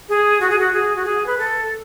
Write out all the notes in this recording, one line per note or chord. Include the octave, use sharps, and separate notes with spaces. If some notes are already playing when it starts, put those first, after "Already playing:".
G#4
F#4
G#4
F#4
G#4
F#4
G#4
B4
A4